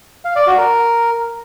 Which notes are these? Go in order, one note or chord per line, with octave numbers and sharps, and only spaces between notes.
F5
D5
F#4
A#4